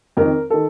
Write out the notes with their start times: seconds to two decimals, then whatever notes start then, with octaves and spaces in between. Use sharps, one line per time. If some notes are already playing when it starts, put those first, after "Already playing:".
0.17 F2 D#3 A#4
0.50 D#3 A4